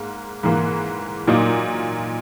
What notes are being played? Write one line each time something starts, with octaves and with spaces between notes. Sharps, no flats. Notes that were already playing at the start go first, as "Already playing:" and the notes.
Already playing: G#2 A#3
G#2 E3 A#3
A#2 F#3 A#3 D#4